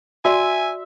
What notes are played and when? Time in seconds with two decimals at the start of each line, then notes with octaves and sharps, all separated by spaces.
0.25 F#4 D5 E5 G#5 C6